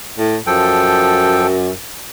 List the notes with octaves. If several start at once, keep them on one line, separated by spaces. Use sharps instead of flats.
A2
F#2 F3 A4 G5